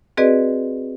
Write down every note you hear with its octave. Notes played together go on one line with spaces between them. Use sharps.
C4 F#4 G#4 B4 D5 D#5